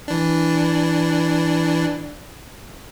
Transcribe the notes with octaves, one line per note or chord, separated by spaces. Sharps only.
E3 D4